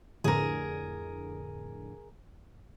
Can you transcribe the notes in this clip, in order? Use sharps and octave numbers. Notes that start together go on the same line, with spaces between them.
F2 A2 D3 G#4 A#4